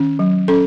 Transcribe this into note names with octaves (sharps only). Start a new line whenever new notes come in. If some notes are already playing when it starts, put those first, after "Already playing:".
Already playing: D#3 C#4
F#3
C#4 A4